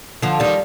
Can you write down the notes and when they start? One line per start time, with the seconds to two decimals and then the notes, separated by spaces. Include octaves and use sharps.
0.22 D3 F3
0.40 D#3 G3